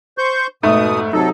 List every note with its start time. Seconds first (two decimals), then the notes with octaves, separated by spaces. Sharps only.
0.18 C5 C#6 G6
0.63 F1 G#2 B2 A3 D#6
1.13 C3 F#3 D#4 A4